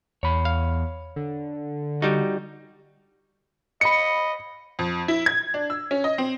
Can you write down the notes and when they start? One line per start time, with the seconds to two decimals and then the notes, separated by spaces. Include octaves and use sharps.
0.23 E2 C#5 B5
0.45 F5
1.16 D3
2.02 G3 D#4 F#4
3.81 D#5 B5 C#7
4.79 F2
5.08 E4
5.26 G#6
5.54 D4
5.70 E6
5.91 C#4
6.04 D#5
6.18 C4